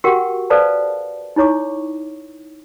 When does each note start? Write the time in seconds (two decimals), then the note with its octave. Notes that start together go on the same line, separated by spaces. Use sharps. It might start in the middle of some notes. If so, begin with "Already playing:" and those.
0.04 F#4 G4 A#4 F#5 G5 C#6
0.50 A4 B4 C5 D5 F5 A5
1.36 D#4 E4 C#5 C#6 D6